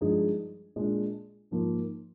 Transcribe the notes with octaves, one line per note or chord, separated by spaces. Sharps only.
G2 F3 G#3 D#4 G#4
A#2 G#3 D4
G#2 F3 A#3